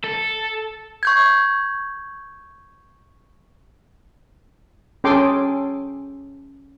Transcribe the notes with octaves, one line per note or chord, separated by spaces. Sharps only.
A4
C#6 G6 G#6
C#4 G#4 A4 G5 C6 D6